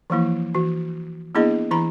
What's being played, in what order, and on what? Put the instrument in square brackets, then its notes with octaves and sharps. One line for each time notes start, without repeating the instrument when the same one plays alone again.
[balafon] E3 F3 A#3 E4
E3 F#4
A#3 B3 D4 E4 G#4 D#5
E3 E4 A#5 B5